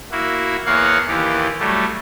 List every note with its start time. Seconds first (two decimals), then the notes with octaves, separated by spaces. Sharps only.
0.11 A#3 E4 F#4
0.66 E2 A#3 C#5 F5 F#5
1.08 D#2 E3 G4
1.59 F#3 G3 A3